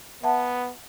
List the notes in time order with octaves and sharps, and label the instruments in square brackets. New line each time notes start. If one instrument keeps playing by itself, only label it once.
[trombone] B3 [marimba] E5 F#5 A5